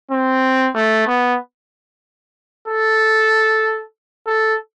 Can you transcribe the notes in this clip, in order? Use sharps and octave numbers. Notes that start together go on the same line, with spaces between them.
C4
A3
B3
A4
A4